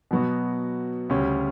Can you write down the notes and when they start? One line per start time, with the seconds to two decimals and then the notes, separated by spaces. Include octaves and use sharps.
0.11 B2 F#3 B3 F#4
1.10 D2 C#3 G3 C#4